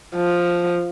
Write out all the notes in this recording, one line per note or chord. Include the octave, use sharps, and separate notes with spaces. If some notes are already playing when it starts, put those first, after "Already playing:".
F3